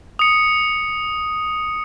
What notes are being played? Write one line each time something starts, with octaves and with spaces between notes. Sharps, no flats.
D#6 C#7